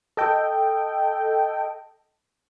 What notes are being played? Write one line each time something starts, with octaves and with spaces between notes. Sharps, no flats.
A4 D#5 G5